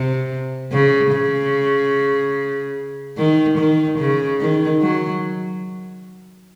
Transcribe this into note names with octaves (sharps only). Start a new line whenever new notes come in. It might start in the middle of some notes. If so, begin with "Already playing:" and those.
Already playing: C3
C#3
C#3
D#3
D#3
C#3
D#3
F#3